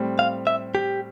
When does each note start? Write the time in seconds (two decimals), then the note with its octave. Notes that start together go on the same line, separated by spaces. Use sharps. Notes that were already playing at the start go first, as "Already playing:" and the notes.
Already playing: A2 G3 C4
0.19 F5
0.47 E5
0.75 G4